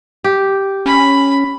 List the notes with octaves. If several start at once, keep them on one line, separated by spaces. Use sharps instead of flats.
G4
C#4 B5